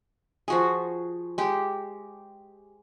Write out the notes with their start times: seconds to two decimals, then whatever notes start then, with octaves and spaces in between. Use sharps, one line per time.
0.48 F3 F#4 G#4
1.38 G#3 G4